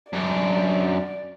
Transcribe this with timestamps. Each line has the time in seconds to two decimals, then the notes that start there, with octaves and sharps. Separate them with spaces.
0.13 F#2 D4 D5